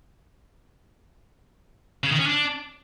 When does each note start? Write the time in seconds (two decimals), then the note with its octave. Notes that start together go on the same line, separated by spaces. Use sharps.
2.04 C#3
2.11 D#3
2.19 C#4
2.26 D4